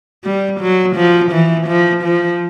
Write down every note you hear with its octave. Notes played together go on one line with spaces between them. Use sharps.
G3
F#3
F3
E3
F3
F3